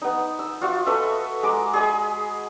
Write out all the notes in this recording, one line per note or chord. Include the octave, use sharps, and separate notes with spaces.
B3 D#4
E6
F4 F#4 E5
A4 B4 D#5 E5
G#3 A#5 D6
G#4 D#5 B5